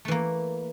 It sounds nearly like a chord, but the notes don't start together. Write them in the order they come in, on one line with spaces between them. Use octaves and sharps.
A3 E3 A#3